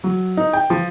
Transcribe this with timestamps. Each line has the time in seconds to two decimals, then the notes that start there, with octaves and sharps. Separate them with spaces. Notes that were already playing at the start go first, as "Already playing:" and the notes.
0.04 F#3
0.37 D#4
0.53 G5
0.70 F3